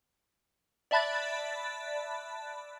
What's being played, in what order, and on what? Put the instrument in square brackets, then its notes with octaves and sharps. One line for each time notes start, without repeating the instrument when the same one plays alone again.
[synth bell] D5 E5 A5 B5 F#6 A6